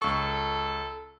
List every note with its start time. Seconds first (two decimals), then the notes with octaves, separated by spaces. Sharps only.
0.02 C#2 A4 C#6